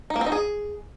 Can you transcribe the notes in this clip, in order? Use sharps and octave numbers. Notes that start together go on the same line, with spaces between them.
D#4
A#3
C4
D#4
G#4